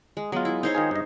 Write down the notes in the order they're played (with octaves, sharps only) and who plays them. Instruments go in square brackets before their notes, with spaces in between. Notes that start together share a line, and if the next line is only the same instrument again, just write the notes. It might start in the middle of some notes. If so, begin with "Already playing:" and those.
[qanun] G#3
[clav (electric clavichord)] F#3 F4 [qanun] G#3 B3
[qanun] E4
D#4 C5 C#5
[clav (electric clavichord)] D#3 F4 G#4
G2 D#5